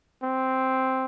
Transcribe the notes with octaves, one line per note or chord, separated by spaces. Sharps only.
C4